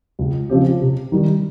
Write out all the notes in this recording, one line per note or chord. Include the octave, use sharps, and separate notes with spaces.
C#2
C#3 F3 C4 G4
C3
D#3 G3